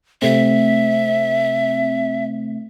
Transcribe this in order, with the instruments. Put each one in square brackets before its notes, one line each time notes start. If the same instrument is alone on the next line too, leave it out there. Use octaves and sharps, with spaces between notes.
[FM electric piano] C3 A3 C4 [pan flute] E5